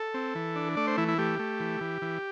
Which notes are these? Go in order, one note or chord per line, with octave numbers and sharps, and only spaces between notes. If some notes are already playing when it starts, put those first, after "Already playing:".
Already playing: A4
C4
E3
D4
A3 D5
C5
E3 E4
E4
A3 G4
A3
E3
E3
E3